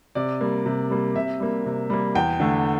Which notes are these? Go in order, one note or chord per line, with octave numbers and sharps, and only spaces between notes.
C3 D5
G3 A#3
C3
G3 A#3
C3 E5
G3 A#3
C3
G3 A#3
E2 G5
D3 A3